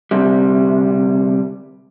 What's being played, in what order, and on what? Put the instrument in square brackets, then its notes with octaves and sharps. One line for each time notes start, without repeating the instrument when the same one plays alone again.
[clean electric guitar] D2 C3 G3